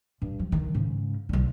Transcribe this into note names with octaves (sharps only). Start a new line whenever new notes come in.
G2
F3
D#3
G#2 C#3
B1 D3